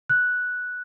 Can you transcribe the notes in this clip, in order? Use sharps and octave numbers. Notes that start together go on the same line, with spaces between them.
F#6